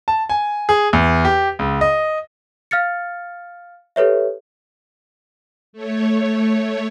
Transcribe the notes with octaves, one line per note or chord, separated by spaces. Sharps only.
A5
G#5
G#4
E2
G4
C#2
D#5
F5 F6 A6 C#7
G4 A4 B4 C#5 E5
A3 C#5